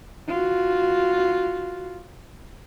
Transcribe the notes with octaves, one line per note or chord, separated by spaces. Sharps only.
F4 F#4